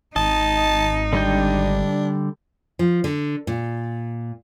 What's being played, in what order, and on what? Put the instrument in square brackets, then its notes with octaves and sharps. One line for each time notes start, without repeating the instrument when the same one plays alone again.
[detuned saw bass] G#1 [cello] D#4 [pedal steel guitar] D#5 [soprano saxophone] A5
[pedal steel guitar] D3 G3 G5 [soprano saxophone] D4
[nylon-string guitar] F3
D3
A#2